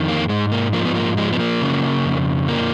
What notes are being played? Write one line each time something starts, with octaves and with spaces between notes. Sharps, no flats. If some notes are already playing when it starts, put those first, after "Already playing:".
Already playing: F2 D#3
A#3
G#2 G#3
A#3
F3 A#3
B3
A#3
F3 G#3
B3
A#3
C#3
F2
F3 A#3